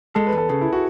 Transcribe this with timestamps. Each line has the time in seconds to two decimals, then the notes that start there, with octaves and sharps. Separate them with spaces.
0.15 G#3 A4
0.27 B4
0.32 E2
0.38 A4
0.49 C#3 G#4
0.61 E4
0.73 F#4